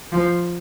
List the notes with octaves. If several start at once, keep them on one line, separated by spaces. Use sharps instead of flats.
F3